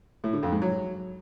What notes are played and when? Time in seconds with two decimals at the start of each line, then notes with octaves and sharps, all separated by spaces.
0.24 A2
0.33 D3
0.43 F2
0.52 G#2
0.62 F#3